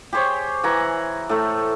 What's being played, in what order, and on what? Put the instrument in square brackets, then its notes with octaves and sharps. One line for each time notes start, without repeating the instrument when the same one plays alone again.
[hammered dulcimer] G4 G#4 C5 C#5
E3 F#5 G#5 A#5
A2 A3